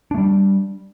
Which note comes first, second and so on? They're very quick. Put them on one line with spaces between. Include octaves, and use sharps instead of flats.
D4 A3 G3